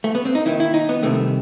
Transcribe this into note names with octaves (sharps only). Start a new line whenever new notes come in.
A3
B3
C4
D#4
D#2 D#3 E4
E4
D#4
B3
C2 C3 D#3 A3